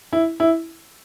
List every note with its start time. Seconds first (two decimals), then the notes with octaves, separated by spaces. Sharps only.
0.13 E4
0.40 E4